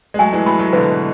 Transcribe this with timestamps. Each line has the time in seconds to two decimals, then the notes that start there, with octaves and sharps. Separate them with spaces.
0.14 G#3
0.19 F#3 A3 G#5
0.33 E3 G#3
0.46 F#3 A3 B5
0.59 F#3 A3
0.73 B2 D3 B4